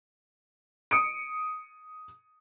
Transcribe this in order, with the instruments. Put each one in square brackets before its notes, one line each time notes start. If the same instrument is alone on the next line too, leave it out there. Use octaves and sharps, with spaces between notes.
[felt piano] D#6 C#7 D7